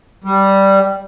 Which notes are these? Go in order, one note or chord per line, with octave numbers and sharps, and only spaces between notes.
G3